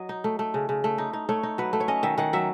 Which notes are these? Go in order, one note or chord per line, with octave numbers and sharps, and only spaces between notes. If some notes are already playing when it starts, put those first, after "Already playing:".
Already playing: F#3 D#5
D#4
A3
A3
C#3
C#3
A3
D#4
D#4
A3 C#5
D#4
F#3 B4
A3
C#5
C#4 D#5
D#3 E5
D#3 F#5
F#3 E5